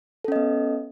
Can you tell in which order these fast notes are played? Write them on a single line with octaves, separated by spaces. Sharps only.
A4 C#4 D#5 B3